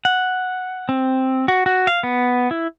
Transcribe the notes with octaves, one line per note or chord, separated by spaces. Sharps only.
F#5
C4
F#4
F#4
F5
B3
E4